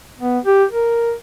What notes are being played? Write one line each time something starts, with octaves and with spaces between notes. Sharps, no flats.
B3
G4
A#4